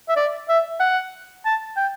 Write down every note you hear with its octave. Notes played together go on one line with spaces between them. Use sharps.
E5
D5
E5
F#5
A5
G5